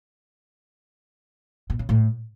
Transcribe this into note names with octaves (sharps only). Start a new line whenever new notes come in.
B2
C#3
A2